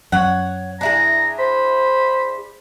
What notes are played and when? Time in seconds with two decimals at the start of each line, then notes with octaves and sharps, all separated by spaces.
0.12 F#2 C#5 F#5
0.81 D4 E4 G#4 A#5
1.39 C5 B5